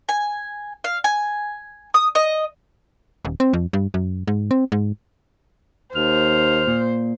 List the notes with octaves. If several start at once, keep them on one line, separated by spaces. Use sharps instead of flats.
G#5
F5
G#5
D#6
D#5
D#1
C4
F2
G2
F#2
G#2
C4
G#2
D#2 C5 F6
A#2